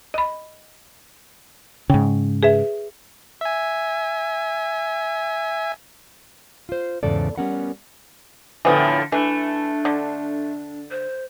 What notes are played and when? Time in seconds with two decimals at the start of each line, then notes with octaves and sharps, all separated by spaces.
0.14 D#5 B5
1.90 G#2 C#3 G5
2.43 G#4 B4 E5
3.41 E5 G#5
6.69 F4 C5
7.03 E2 G#2 C#3 A4 D5
7.38 G3 B3 C#4 A#4 F#5
8.65 A2 D3 E3 F3 B3
9.12 E3 A3 D4
9.85 D3
10.91 C5